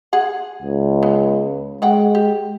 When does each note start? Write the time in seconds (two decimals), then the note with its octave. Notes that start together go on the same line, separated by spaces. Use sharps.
0.13 G#4 F#5
0.63 C#2
1.03 B3
1.82 F#3 G#3 F#5 G5
2.15 G4